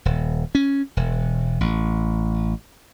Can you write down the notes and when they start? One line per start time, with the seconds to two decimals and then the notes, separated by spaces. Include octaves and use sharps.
0.05 D#1
0.55 C#4
0.97 E1
1.61 A1